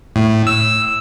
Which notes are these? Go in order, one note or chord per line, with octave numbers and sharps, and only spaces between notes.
A2
E6